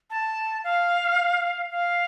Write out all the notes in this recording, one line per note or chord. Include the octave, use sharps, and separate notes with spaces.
A5
F5
F5